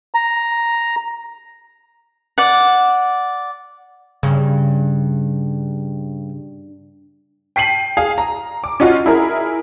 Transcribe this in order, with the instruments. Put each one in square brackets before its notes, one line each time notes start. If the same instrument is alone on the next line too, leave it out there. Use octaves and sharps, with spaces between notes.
[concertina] A#5
[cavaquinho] D5 F#5
[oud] G2 [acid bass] C#3
[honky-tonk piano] G5 B6 C7 D#7 F#7
G#4 F5
A#5
D6
C#4 D#4 F4 F#4
E4 G#4 A#4